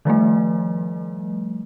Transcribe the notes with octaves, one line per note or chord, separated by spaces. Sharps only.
D#3 F3 G3 A3